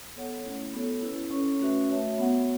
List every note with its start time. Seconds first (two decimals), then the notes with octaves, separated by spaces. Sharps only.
0.16 B3 A4 C#5 F#5
0.44 A3 C#4 E4
0.73 B3 F#4 A4 C#5
1.02 C#4 E4 B4
1.30 C#4 A4 C#5
1.59 A3 C#4 F#4 B4 E5
1.89 A3 F#4 C#5 E5
2.19 B3 F#4 C#5 F#5